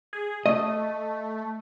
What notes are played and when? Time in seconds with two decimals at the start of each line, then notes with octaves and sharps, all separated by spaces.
0.13 G#4
0.46 A3 D#5